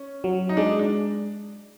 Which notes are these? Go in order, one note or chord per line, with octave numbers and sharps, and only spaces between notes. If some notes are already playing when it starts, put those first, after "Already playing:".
Already playing: C#4
F#3
D#4
G#3 D4
D4